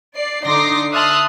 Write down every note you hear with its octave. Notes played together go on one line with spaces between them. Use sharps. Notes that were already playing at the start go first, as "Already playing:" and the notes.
D5 C7
D3 D#4 C6 D6 A#6 C7
E5 A5 C6 D#6 F6 F#6